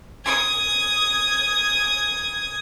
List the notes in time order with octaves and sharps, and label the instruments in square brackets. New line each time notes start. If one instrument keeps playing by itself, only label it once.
[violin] D#6 G#6